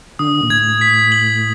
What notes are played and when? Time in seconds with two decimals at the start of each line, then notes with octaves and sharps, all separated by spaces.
0.19 D3 D#6
0.43 A#2
0.50 A2 G#6
0.81 B6
1.12 F#7